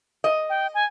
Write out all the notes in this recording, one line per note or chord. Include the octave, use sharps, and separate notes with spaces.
D#5
G5
G#5